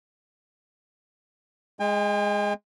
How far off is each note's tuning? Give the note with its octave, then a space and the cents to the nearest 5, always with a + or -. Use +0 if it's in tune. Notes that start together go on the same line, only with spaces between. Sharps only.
G#3 +0 G5 +45